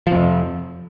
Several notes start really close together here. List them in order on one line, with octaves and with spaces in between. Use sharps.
F3 C3 F2